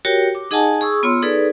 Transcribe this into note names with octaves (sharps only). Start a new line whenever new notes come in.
F#4 G4 A#4 C#5 G5
D6
D#4 G#4 D#5 F#5 G#5 A5
G#4 C#6 D#6 E6
B3 F4 C#5 C6 E6
D#4 G#4 A4 B4 D5